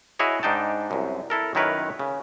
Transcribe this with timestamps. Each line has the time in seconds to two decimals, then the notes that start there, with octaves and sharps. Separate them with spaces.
0.19 E4 F#4 G#4 C#5 D#5
0.43 G#2 D4 D#4 G5 A5
0.91 C2 F#2
1.30 E4 A4 A#4
1.55 F#2 D#3 E4 A#4 B4 C#5
1.99 C#3